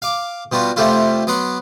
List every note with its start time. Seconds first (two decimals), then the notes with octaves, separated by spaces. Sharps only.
0.02 F5 D6
0.52 B2 G3 F4 F#4
0.76 C3 G3 A3 E4 F4
1.27 F#3 B3 F#5 C6